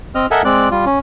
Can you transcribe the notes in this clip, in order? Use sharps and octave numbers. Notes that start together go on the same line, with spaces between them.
C4 D#5 F6
A4 A#4 D#5 E5 F#5 G#5
G#3 C4 D5 F#6
G3 F4
C#4